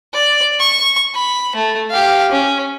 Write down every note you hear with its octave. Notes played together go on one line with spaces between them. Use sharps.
D5
C#6
B5
A3
G4 F5
C#4